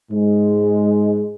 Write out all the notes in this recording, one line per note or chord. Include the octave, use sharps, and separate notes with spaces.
G#2 G#3